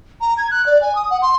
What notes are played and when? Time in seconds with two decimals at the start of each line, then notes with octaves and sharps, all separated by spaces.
0.21 A#5
0.38 G#6
0.51 F#6
0.66 D5
0.81 G#5
0.95 D#6
1.10 F#5
1.22 C6